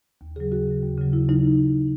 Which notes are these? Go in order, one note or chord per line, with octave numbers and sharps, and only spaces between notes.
D#2
C#3 F#3 G#4
D#2 F#4
C#3 F#3
D#2
C#3 F#3
D#2 E4
C#3 F#3 D#4